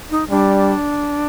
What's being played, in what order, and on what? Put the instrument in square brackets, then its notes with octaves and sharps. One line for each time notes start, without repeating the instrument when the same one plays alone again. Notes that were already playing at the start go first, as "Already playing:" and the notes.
[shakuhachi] D#4
[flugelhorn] G3 [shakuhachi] D4